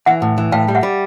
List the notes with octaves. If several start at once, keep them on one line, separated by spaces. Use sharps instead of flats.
E3 E5 F#5
A2
E3
A2 F5 G5
G3
E5 F#5
G3